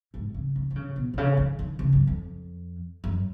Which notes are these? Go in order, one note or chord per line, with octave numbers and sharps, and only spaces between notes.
G#2
C#3
C#3
D#3
C#3
B2
B2
C#3
D#3
D#3
C#3
F#2
F2
F#2